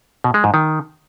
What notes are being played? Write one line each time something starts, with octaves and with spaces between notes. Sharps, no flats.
B2
G#3
G#2
D#3